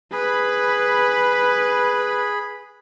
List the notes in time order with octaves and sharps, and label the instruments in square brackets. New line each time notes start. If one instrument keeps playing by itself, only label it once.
[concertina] G#4 B5 [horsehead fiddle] B4